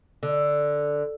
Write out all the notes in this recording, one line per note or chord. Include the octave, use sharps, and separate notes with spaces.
D3